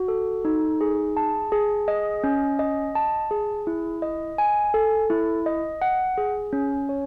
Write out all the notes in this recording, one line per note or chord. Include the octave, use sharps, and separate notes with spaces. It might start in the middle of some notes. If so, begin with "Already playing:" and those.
Already playing: F#4
A4
D#4
G#4
A5
G#4
D#5
C#4
D#5
A5
G#4
E4
D#5
G#5
A4
E4
D#5
F#5
G#4
C#4
C#5